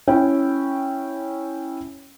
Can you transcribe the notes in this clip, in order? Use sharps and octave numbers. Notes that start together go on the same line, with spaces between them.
C#4 E4 C#5 G5